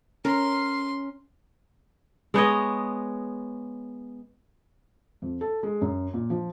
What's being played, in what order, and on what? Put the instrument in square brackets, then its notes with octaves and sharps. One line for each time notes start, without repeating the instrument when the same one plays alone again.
[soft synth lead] C#4 [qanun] A#4 [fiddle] C6
[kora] G#3 B3 C#5 D#5
[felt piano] F2
A4
G#3
F#2
A#2
F3